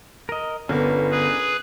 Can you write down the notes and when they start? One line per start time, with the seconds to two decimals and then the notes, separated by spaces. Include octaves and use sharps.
0.29 A#4 D#5
0.69 G1 B3 C#4 D4 A#4
1.11 G#4 B4